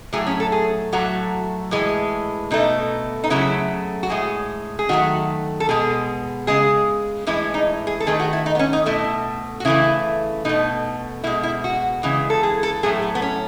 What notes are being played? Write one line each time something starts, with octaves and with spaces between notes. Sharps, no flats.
A2 F#3 A3 G#4
C#4
A4
G#4
A2 F#3 A3 F#4
A2 E3 G#3
B2 A3 D#4
D#4
C#3 F#3 A3 E4
F#4
A2 G#3 G#4
G#4
D#3 F#3 A3 F#4
A4
B2 G#3 G#4
C#3 G#3 G#4
A2 E3 G#3 E4
D#4
G#4
A4
D#3 A3 G#4
F#4
E4
D#4
B3
C#4
D#4
B2 A3 E4
F#4
C#3 E3 A3 E4
B2 A3 D#4
B2 G#3 E4
E4
F#4
C#3 E3 G#3
A4
G#4
A4
A2 F#3 A3 G#4
B3
B3
C#4